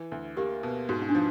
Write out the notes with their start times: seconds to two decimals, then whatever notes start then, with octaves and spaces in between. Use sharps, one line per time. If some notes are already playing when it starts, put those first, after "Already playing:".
Already playing: E3
0.12 D2
0.37 A#3 G4
0.63 B2
0.89 G#2 F#4
1.02 D#4
1.09 D4
1.15 F3 D#4